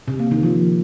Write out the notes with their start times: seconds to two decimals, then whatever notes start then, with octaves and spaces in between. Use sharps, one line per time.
0.08 C3
0.19 A#3
0.31 D#3
0.43 F3